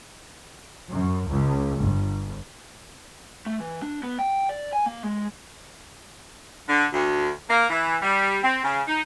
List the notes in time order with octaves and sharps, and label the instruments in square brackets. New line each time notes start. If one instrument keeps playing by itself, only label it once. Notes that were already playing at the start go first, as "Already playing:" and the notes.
[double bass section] F#2
C#2
G1
[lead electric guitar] A3
E3
D4
B3
G5
D5
G#5
A#3
G#3
[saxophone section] D3
D2
A#3
E3
G3
C4
C#3
D#4